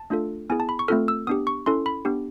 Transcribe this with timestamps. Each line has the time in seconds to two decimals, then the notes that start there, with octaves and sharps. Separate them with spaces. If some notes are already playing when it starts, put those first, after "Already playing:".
Already playing: A5
0.10 A3 D4 F4 A4
0.50 B3 E4 G#4 G#5
0.60 A5
0.69 B5
0.79 C#6
0.88 A3 C4 F4 A4 F6
1.08 E6
1.27 B3 D4 G4 D#6
1.47 C#6
1.66 C#4 E4 A4 C6
1.86 B5
2.05 B3 D4 G4